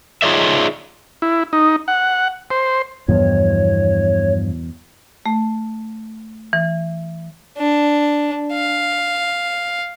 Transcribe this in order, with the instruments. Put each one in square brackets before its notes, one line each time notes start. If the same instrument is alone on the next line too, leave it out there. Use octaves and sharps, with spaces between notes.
[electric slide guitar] D#4 F4 G#4 C#5 D5 E5
[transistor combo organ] E4
D#4
F#5
C5
[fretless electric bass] E2 B2 E3 [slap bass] G2 F3 [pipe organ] C#5
[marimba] A3
E3
[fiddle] D4
F5